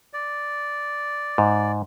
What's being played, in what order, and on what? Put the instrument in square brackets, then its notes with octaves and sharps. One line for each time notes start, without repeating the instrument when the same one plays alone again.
[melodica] D5
[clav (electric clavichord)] G#2